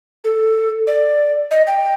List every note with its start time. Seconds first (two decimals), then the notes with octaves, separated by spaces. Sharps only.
0.24 A4
0.87 D5
1.51 D#5
1.67 G5